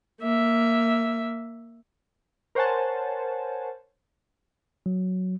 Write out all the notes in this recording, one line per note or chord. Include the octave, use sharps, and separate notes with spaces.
A#3 E5
A#4 C5 C#5 F#5 G#5 A5
F#3